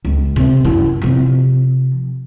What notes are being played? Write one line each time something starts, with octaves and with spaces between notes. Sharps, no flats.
C#2
C3
F#2 E4
C3 F3